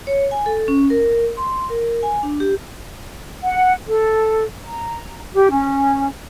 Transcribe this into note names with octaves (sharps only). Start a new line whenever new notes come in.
C#5
G#5
A4
C#4
A#4
C6
A#4
G#5
D4
G4
F#5
A4
A#5
G4
C#4